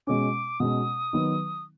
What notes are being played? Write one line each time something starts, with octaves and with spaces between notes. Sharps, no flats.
B2 G#3 C#4 D6
B2 G#3 C#4 D#6
D#3 F#3 B3 D#4